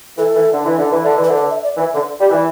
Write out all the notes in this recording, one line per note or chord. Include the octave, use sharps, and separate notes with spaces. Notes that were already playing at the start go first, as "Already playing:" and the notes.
E3 A4
E3
D3
E3
D3
E3
D3
E3
B4
D3
D5
E5
D5
E3
D3
G3
E3